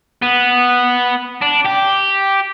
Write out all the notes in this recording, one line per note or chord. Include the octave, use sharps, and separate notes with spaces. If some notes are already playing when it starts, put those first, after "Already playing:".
B3
D4
G4